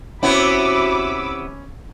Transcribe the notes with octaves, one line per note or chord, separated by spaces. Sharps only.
C3 B3 C#4 E4 F#4 B5 D6 E6